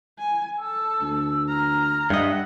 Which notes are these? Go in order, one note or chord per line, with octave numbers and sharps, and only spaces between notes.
G#5
A4 A5 E6
D2
A#5 F6
G2 D#5 E5 F#5